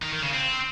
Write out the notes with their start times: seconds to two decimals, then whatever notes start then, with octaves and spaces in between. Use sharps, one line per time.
0.02 D#3
0.13 D#3
0.23 C#3
0.33 C4